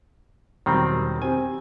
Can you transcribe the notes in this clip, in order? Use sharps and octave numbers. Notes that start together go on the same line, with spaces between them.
E1 D#3 F#3 G3 C4 A#5
C4 G4 G#5